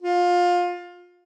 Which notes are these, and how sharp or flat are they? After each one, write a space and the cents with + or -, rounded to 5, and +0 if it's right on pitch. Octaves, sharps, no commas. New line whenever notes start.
F4 +20